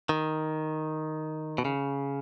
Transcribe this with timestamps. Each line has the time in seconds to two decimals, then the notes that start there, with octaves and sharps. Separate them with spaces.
0.09 D#3
1.58 B2
1.65 C#3